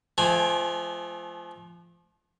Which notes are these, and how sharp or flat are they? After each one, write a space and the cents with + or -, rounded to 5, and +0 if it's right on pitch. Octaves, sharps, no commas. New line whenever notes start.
F3 -15 A3 -45 G#5 -20